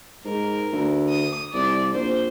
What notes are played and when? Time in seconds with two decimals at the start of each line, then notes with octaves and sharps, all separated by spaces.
0.25 G#2 A#4
0.72 D2
1.09 D#6
1.54 C2 D5
1.93 A#1 C5